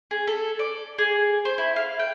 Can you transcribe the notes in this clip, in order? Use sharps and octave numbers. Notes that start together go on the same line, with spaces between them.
G#4
A4
D5
G#4
C5
E4
F5
G5